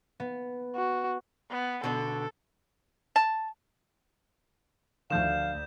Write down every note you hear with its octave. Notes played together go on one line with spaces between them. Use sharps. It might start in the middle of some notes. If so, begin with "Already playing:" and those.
B3
F#4
B3
B2 D3 A4
A5
D2 D#3 F3 A3 F5 G6 E7